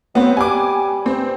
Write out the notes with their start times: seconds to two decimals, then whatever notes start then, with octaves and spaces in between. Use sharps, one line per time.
0.15 F#3 B3 C4
0.37 G3 G#5 D6
1.06 G2 C4